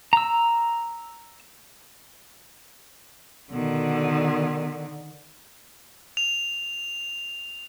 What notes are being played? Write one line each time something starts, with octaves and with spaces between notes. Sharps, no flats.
A#5 E6
B2 D3 D#3
F7